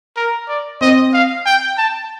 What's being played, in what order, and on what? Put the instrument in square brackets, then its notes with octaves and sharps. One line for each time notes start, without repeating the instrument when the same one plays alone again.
[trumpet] A#4
D5
[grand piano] C4 [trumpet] D#5
[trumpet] F5
G5
A5